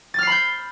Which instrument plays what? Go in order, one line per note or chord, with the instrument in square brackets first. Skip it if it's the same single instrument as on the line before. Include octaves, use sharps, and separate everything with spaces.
[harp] A6
F6
C7
B5
G6